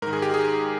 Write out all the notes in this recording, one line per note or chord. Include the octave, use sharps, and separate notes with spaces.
G#2 D#3 A#4
G#4
G4
G#4